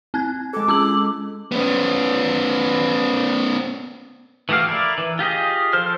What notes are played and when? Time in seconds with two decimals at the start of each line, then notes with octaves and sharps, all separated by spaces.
0.14 C4 F#6 G#6
0.53 G#3 A4 D6
0.68 C#4 E6 F#7
1.52 B3 C#4
4.49 E3 A3 F#4 G4 F5
4.69 E4 A#4 D5
4.98 E3
5.19 F4 G4 G#4 D#5
5.73 F3 A4 C5 F6